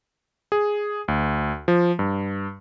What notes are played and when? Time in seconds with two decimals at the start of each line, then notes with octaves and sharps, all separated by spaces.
0.52 G#4
1.08 D2
1.68 F3
1.99 G2